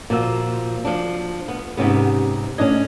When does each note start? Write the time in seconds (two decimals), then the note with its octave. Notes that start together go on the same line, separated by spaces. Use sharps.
0.10 A#2 F3 A#3 F#4 E6
0.85 F3 D4
1.48 B3
1.77 G#2 C3 B3 C#4 G4
2.58 A2 C#4 D4 D#5 G#6